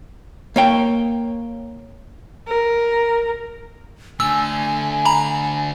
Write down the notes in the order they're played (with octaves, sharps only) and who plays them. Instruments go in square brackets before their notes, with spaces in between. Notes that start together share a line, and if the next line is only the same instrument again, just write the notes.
[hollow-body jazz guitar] A#3 C#5 G5
[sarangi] A#4
[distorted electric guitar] D3 A3 [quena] G#5 [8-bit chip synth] E6
[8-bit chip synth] A#5 B5